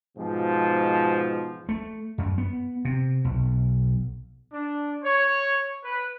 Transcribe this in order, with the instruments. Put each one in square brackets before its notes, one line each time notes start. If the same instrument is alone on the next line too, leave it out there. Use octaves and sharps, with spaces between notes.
[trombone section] G#2 B2 F3
[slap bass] A3
F#2
B3
C3
B1
[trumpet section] D4
C#5
B4